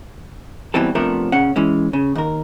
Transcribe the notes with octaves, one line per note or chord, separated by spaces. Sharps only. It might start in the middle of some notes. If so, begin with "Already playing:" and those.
B1 B2 E3 G3 C4 A4
C3 F3 A3 B3 D4 A#4
A#2 C#3 C#4 F#5
E3 G#3 C#4
C#3
D#2 A#4